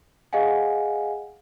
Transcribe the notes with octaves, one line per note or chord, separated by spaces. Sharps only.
G#4 D#5 F5 F#5 G#5